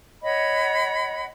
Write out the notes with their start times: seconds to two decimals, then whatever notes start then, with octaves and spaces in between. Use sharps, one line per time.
0.22 C#5 D#5 F#5 B5